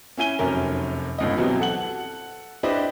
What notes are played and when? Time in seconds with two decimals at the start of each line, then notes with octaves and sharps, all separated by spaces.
0.17 C#4 E4 G#5 D#7 G7
0.39 F1 F#2 C3 C#4 A#4
1.18 G1 C#2 D#5
1.37 B2 E3 F#3 G3 C4
1.60 A4 F#5 F#7
2.63 D4 E4 G4 B4 C5 D#5